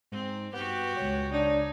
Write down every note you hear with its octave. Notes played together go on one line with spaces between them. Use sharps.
G#2 C4
G2 B3 F#4 G4
C#2 G#3 C#5
D4 D#4